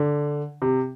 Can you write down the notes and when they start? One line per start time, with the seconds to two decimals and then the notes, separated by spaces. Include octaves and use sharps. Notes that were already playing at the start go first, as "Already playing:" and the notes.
Already playing: D3
0.62 C3